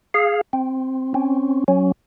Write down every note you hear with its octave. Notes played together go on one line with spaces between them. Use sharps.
G#4 F5
C4
C4 C#4
F#3 C#4